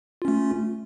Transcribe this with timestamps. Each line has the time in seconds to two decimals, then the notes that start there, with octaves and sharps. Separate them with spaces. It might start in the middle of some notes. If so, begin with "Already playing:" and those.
0.22 F4
0.25 C#4
0.28 A3